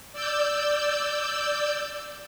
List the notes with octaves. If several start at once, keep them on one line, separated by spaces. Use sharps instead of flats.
D5 E6 G6